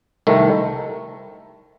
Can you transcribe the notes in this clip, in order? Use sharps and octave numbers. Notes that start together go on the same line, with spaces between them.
C2 C3 D#3 A3